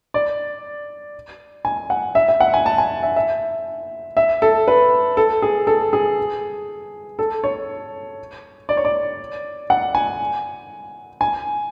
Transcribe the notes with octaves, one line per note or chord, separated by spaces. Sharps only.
D5
G#5
F#5
E5
E5
F#5
G#5
A5
G#5
E5
E5
E5
A4
B4
A4
G#4
A4
G#4
A4
C#5
D5
C#5
D5
F#5
G#5
G#5